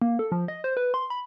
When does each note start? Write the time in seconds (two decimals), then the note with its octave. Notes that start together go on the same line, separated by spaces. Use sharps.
0.02 A#3
0.19 A4
0.32 F3
0.48 D#5
0.64 C5
0.77 B4
0.94 C6
1.10 B5